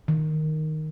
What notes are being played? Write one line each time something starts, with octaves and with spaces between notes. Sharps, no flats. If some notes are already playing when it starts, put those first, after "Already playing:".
D#3